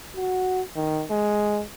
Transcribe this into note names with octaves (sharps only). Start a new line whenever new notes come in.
F#4
D#3
G#3